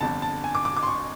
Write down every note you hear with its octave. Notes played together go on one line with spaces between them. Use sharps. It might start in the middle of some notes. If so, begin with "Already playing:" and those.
G1 F2 D3 A5
A5
G#5
D6
D6
D6
C6
C#6